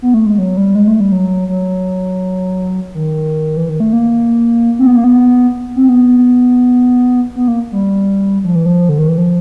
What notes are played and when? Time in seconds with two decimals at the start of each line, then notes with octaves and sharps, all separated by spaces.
0.02 B3
0.14 A3
0.26 G#3
0.38 F#3
0.57 G3
0.75 G#3
0.88 A3
1.00 G3
1.12 F#3
1.48 F#3
2.95 D#3
3.57 E3
3.69 D#3
3.80 A3
3.93 A#3
4.79 C4
4.87 B3
4.96 A#3
5.04 B3
5.76 C4
5.88 B3
7.36 B3
7.48 A#3
7.72 G3
8.44 F3
8.55 E3
8.66 F3
8.89 D3
8.98 D#3
9.08 E3
9.18 F3